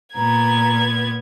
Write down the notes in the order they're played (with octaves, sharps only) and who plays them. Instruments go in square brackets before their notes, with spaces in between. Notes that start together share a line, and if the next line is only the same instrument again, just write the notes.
[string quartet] A#2 B3 G#6 [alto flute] A#5